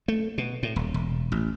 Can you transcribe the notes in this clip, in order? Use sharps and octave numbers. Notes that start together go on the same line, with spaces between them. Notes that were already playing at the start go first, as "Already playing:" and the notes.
A3
B2
A2
D#1
E1
A1